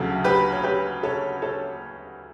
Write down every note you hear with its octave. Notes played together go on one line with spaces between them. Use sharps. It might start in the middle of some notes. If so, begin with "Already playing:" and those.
Already playing: D2 C#3 F#3 A4
G4 B4
C#5
G4 B4
A4 C#5
A4 C#5